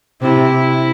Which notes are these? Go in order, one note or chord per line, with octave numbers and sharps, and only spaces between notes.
C3 E4